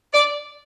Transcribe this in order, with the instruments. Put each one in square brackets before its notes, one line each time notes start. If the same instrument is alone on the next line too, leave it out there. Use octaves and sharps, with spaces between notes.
[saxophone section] D5